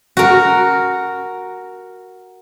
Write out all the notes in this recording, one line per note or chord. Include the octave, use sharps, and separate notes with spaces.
F#4 A#4